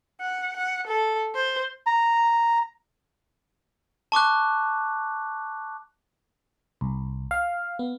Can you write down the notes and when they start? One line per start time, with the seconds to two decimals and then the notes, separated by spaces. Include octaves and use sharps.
0.21 F#5
0.56 F#5
0.87 A4
1.35 C5
1.87 A#5
4.12 A5 C#6 D6 F#6
6.81 C2
7.31 F5
7.79 B3